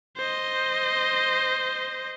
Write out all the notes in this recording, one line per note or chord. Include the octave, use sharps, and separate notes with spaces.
C5 D#5